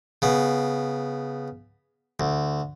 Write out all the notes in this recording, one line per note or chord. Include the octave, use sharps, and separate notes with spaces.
C#3 B3
D2